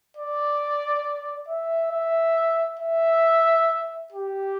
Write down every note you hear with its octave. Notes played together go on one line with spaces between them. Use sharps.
D5
E5
E5
E5
G4